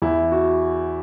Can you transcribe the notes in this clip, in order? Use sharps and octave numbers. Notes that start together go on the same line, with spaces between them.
E2 E4
F#4